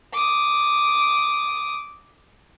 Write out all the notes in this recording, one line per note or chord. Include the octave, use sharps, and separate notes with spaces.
D6 D#6